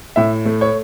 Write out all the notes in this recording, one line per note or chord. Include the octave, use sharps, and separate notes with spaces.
A2 E5
A3
C#5